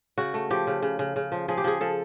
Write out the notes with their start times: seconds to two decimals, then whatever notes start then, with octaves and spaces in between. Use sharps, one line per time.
0.18 C#3 F#4
0.34 A3
0.50 F3 G4
0.67 C#3
0.82 C#3
0.99 C#3
1.16 C#3
1.32 F3
1.48 F3 G#4
1.58 G4
1.64 F3 G#4
1.81 F3 A4